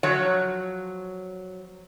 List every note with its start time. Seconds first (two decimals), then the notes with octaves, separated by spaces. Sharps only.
0.03 F3 F#3 C#5